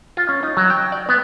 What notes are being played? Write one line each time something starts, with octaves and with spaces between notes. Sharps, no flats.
F4
C#4
D#4
F#3
G5
D5
B3